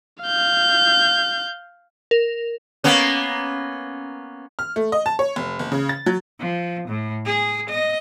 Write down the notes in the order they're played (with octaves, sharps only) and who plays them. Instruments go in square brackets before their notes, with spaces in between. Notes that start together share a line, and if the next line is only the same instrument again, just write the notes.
[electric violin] F5 G6
[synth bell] A#4
[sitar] A#3 B3 C#4
[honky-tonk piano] F6
A3
D#5
A5
C#5
F1
F#1
C#3
A6
F#3
[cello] F3
A2
G#4
D#5